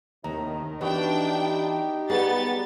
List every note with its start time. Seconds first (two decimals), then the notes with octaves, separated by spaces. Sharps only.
0.24 D#2 A2 C3 D#3 A#5
0.81 E3 B3 D4 D#4 F#4 G4 G5
2.10 F#3 G3 B3 G#4 A6